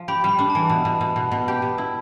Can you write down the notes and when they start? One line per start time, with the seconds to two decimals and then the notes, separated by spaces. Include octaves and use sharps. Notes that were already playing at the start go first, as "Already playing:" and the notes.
Already playing: F3
0.08 G4 B5
0.24 G3 B5
0.39 D4
0.50 A5
0.55 E3
0.69 B2
0.85 B2
1.01 B2
1.16 B2
1.32 B2
1.48 G4
1.62 B2
1.78 E4